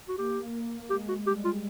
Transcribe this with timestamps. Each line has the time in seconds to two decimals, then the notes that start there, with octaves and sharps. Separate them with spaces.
0.08 F#4
0.17 A#3 G4
0.90 G#3 G4
1.08 F#4
1.26 G3 G4
1.45 F4